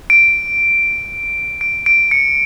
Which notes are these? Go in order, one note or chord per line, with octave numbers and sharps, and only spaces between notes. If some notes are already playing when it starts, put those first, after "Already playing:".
D7
D7
D7
C#7